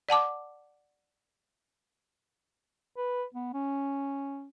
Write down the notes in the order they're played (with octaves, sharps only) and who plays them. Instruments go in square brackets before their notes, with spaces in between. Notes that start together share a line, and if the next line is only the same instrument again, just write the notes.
[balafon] D5 F#5 A5 D6
[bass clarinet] B4
B3
C#4